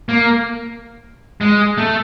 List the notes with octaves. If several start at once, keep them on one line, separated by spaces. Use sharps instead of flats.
A#3
G#3
A3